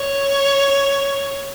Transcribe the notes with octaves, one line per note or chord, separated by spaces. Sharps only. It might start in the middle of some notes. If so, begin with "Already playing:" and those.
Already playing: C#5